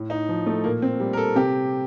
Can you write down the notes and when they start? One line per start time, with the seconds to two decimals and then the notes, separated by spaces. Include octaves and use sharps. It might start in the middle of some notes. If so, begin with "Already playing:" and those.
Already playing: A2
0.10 D#4
0.29 F3
0.46 A3
0.64 A#2 A#3
0.82 C4
1.00 G3
1.13 A#4
1.17 A4
1.35 C3 G4